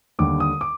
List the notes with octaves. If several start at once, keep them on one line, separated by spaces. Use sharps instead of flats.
D#2 D3 G3 D6
D#6
D6